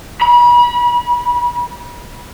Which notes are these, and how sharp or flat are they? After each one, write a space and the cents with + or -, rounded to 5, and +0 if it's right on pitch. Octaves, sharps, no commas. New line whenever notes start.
B5 -35